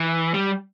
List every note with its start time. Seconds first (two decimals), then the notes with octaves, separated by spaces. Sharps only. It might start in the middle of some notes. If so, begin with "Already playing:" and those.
Already playing: E3
0.34 G3